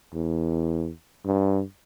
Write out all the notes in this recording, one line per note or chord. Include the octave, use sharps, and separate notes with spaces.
E2
G2